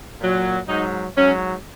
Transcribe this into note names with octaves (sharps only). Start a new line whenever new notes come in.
A#2 F#3
G#2 F#3 D#4
G#2 F#3 C#4